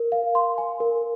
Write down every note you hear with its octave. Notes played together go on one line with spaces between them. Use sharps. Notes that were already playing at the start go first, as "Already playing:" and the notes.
Already playing: A#4
F5
C6
G#5
A#4